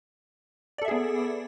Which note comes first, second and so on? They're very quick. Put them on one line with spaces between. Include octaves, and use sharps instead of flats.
D5 A4 E5 G#4 B3